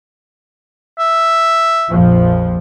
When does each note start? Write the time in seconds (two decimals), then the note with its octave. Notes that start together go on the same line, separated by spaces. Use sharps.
0.99 E5
1.89 A#1 F2 F3